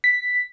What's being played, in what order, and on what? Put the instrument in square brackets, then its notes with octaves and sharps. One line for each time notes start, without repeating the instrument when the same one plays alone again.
[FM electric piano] B6